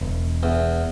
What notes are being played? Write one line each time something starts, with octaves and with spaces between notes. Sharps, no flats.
E1
E2